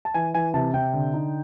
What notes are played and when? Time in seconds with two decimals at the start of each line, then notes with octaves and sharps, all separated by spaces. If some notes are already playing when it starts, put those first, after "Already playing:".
0.05 A5
0.14 E3 G#5
0.34 E3 G#5
0.54 C3 A5
0.74 C3 G5
0.93 D3
1.14 D#4